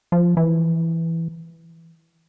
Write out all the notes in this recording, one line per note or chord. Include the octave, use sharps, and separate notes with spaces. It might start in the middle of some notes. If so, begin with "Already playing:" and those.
F3
E3